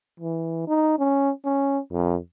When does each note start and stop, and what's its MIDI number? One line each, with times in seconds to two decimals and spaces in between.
0.20 0.65 52
0.67 0.95 63
0.99 1.31 61
1.45 1.79 61
1.92 2.17 41